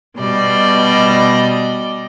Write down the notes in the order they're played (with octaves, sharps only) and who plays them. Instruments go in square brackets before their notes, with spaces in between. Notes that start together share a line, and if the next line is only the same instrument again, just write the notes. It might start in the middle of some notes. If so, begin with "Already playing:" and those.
[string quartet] B2 G3 D5 D#5